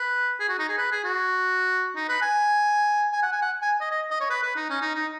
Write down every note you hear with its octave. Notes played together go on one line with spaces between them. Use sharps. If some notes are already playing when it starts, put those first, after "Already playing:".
Already playing: B4
G#4
F#4
D#4
G#4
B4
G#4
F#4
D#4
B4
G#5
G#5
F#5
G#5
F#5
G#5
D#5
D#5
D#5
C#5
B4
B4
D#4
C#4
D#4
D#4